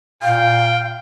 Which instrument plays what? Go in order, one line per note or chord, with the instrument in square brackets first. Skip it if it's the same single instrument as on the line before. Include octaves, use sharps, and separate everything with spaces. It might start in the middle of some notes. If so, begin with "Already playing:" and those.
[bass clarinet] A#2 [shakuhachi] F5 [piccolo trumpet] G5